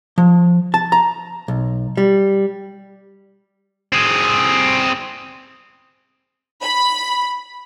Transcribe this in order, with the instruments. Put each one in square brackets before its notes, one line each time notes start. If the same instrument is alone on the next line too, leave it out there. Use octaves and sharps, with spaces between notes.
[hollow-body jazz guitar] F3
A5
A#5
B1
G3
[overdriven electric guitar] C4 G#4
[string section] B5